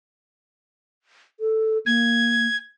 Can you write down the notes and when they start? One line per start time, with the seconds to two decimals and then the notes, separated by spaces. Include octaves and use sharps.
1.40 A4
1.86 A#3 G#6